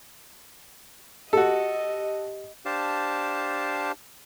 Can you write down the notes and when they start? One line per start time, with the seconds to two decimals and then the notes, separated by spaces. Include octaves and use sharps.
1.33 F#4 G4 A4 D#5
2.65 D4 G4 C5 F5 A5